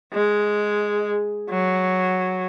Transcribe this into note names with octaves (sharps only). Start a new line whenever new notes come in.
G#3
F#3